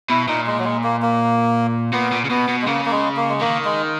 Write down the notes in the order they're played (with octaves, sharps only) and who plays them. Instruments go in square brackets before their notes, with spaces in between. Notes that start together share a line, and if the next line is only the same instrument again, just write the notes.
[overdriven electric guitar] B2 [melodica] E4
[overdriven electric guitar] A#2 [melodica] D#4
[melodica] G#3
F#3
G#3
A#3
A#3
[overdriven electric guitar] A#2 [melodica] B3
[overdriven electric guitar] A#2
C#3
[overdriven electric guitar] B2 [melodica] B3
[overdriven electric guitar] B2
[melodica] G#3
[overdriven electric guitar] C#3 [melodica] A#3
[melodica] A#3
G#3
A#3
G#3
[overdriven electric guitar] D#3 [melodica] A#3
[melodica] G#3